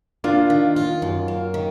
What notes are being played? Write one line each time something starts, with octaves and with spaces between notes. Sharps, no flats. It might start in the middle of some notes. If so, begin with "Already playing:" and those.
A#3 D4 F4
D#3
F4
F#2
A#3
D#3